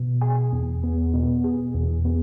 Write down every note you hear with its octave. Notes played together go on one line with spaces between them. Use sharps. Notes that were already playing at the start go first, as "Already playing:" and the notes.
Already playing: B2
G#4
E2
B3
B2
G#4
E2
B3